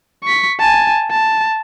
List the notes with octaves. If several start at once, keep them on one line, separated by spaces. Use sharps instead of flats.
C#6 B6
G#5 A5
A5